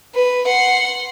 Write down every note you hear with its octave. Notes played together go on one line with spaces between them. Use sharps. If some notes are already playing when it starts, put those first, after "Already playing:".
B4
F#5 C6